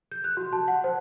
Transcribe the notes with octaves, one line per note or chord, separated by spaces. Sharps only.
G6
F#6
F#4
A5
F#5
C5